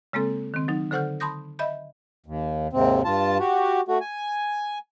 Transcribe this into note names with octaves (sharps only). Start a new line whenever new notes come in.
C#3 G#3 A#3 C4 A4
D#3 C4
F#3 D#4
D3 A4 C5 F#5 F6 G6
A5 B5 C6 D#6 G6 A#6
D#5 E5 B5 G6
D#2
D#2 G#2 C3 C4
G2 F4 A5
F#4 G4
A3 F#4
G#5